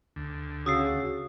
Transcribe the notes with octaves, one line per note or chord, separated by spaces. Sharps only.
D2
C#3 F#4 D#6 E6 C7